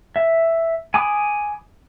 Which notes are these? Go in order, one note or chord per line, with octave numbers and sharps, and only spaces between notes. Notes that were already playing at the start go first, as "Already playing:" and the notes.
E5
G#5 B5 D6 D#6